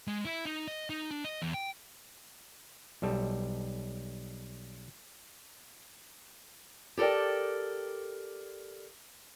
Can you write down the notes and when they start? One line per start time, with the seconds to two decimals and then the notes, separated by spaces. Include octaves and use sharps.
0.08 G#3
0.25 E4
0.45 D#4
0.67 D#5
0.90 D#4
1.11 D4
1.24 D#5
1.42 E2
1.54 G5
3.02 B1 G3 A4
6.97 G4 A4 A#4 D5 G5